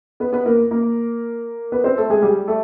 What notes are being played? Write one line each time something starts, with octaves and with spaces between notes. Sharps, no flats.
B3 B4
B3 B4
A#3 A#4
A#3 A#4
B3 B4
C4 C5
A3 A4
G#3 G#4
G3 G4
A3 A4